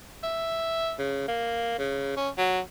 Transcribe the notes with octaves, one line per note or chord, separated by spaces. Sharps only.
E5
C#3
A#3
C#3
C#4
F#3